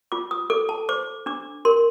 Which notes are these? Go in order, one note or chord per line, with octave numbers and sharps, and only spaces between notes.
F4 D6
D#6
A4 D6
A5
C5 D6
D4 D6
A#4 C6